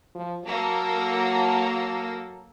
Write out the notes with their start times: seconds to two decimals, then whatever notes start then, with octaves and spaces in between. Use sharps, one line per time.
0.15 F3
0.44 F#3 A#3 A4